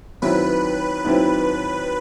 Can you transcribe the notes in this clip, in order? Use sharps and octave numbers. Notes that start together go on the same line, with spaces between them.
D#2 D#3 F#3 C4 E4 B4
D#2 D#3 F#3 C4 E4